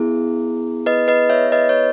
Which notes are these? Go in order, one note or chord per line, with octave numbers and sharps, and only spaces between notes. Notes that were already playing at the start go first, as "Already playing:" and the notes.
Already playing: B3 E4 G#4
B4 D#5
B4 D#5
C#5 E5
B4 D#5
C#5